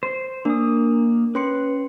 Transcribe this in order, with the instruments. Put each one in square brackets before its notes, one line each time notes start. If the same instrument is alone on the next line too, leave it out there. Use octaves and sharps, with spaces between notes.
[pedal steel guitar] C5
[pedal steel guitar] A#3 D#6 [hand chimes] D4
[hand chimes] C#4 C6 C#7 [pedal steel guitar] B4